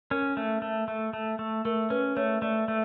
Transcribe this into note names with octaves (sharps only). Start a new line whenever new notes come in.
C#4 A#4
A3
A3
A3
A3
A3
A3 A#4
C#4 B4
A3 C#5
A3 D5
A3